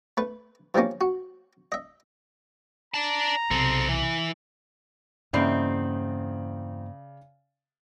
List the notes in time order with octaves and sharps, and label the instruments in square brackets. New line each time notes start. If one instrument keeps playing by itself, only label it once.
[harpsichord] A3 B4
E3 F3 G3 A#3 C#4
F#4
D#5 E5
[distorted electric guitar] D5 A5 [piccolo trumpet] A#5
[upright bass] B1 C3 [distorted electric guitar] C4 A4
[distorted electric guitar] E3
[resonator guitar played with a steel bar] E2 C4 D#4 [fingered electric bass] G2 A#3 [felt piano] C#3 D5 C7